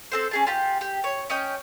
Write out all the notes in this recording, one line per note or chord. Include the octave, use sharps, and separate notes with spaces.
C4 A4 C5
C#4 G#4 A5
F4 G4
G4
C#5
C#4 D#5 G5